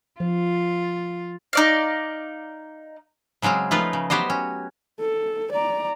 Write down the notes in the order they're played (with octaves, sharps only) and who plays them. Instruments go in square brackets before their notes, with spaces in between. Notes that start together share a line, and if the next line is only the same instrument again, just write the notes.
[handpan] F3 [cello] F4
[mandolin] D#4 D5 F5
[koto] C#3 F#3 G#3 C4 C#4
F3 A3 D#4 F4 B4
C#3
F#3 B3 G4 C5 D#5
C#4
[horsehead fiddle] A4
D5 A#5